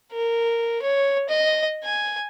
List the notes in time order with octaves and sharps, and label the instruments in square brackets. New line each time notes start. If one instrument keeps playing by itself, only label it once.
[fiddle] A#4
C#5
D#5
G#5